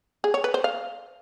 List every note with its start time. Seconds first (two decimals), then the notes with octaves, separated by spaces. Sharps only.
0.24 G#4
0.34 C#5
0.44 B4
0.54 C5
0.64 F5